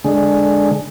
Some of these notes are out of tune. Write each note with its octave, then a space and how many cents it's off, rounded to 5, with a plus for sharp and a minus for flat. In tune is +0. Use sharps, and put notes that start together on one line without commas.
D3 +0 G#3 +0